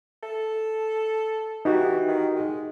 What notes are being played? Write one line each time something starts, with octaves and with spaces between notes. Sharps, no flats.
A4
E3 D#4 F#4 G4
D#3
G#3